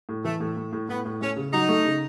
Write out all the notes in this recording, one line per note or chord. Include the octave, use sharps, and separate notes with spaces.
A2
E3 A3
A2
A2
A2
A2 B3
A2
A3 C#4
C#3
F#3 D#4
A3
C#3